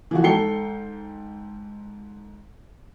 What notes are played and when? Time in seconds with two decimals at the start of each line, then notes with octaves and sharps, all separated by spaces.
0.11 E3 F3 F#4
0.24 G#2 A4 G5 C7 C#7 G7